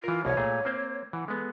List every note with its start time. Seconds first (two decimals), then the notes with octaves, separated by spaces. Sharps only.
0.04 E3 F4 A#4
0.25 C2 B2 C#5
0.37 A#2 A3 G#4
0.65 A#3 C4 C5
1.13 E3 F#5
1.28 G#3 B3 A4